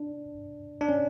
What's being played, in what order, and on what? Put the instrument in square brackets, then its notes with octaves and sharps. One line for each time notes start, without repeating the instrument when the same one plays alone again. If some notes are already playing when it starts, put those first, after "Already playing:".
Already playing: [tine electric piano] D4
D4
C#4